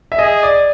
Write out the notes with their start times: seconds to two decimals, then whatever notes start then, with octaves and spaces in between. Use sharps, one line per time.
0.12 E5
0.19 G#4 D#5
0.43 D5